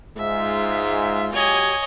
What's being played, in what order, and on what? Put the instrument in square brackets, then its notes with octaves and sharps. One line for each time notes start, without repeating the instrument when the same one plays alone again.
[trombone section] G#2 [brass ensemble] G#3 F4 [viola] E5
[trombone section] F#3 G4 [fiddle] C#5 D#5 [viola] G#5